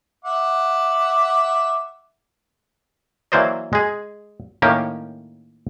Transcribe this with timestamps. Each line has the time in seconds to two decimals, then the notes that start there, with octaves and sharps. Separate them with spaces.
0.24 E5 F#5 D6
3.32 E3 F#3 A#3 C5 D5 D#5
3.73 G#3 G#4
4.62 A2 D#3 A#3 C#4 G4